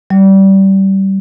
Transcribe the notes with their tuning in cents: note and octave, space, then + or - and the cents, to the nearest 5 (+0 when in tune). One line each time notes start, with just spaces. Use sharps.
G3 -20